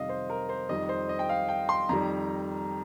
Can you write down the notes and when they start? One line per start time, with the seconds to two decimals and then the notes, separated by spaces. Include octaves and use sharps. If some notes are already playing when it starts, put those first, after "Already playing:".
Already playing: F2 C3 D#3 G3 D#5 F5
0.09 C5
0.30 A#4
0.49 C5
0.69 F2 D#3 G3 D#5
0.89 C5
1.09 D#5
1.19 G5
1.29 F5
1.49 G5
1.69 C6
1.89 F2 D#3 G3 A#5